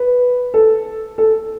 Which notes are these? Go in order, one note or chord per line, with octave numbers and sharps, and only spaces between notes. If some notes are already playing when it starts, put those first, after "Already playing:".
Already playing: B4
A4
A4